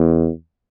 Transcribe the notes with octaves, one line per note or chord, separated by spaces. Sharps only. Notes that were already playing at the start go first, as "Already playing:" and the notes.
Already playing: E2